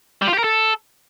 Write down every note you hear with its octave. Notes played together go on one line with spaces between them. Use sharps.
G3
F4
G4
A#4
A4